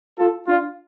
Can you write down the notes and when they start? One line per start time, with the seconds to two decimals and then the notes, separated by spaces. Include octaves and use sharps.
0.19 F4 A4
0.48 D4 F4